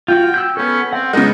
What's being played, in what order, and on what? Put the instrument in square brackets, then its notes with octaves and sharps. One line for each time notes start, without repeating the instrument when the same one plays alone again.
[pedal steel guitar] F4 F#4 [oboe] G5
[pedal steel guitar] E6 F#6 G6
[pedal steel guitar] B3 A4 [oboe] C#4
[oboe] C4 [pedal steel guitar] F#5
[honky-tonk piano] C#3 G#3 [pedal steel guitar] B3 F#6 [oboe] D#4